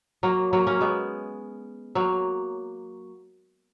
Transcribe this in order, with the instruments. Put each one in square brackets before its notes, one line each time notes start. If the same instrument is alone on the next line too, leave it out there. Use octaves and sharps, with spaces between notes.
[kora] F#3 A#3
F#3 A#3
A#3 C#4
G#3 B3
F#3 A#3